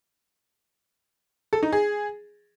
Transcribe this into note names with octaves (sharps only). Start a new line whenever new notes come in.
A4
D#4
G#4